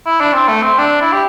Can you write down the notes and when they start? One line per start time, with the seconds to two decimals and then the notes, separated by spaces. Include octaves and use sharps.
0.06 E4
0.21 D4
0.33 C4
0.48 A3
0.63 C4
0.79 D4
1.01 E4
1.12 G4